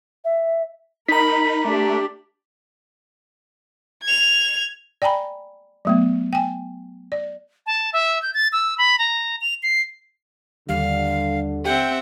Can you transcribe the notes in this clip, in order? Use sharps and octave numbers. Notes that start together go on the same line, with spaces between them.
E5
D#4 A#4 A#5 B5 B6
A3 D4 G4
G#6 F7
D5 G5 G#5 A#5 B5
F#3 A3 B3
G5 G#5
D5
A5
E5
G6
A6
E6
B5
A#5
F7
C7
D#2 D3 G3 F5
C4 G4 E5 F#5 G5